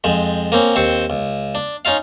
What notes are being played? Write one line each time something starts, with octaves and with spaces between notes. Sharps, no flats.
F2 F3 G#3
A#3 C4 C#4
D#2 C4 C5 C#6
C#2
D4
C#4 D#4 F4 F5